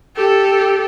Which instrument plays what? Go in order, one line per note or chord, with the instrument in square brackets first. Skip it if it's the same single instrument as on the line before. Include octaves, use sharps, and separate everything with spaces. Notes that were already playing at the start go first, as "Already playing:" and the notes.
[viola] G4 A4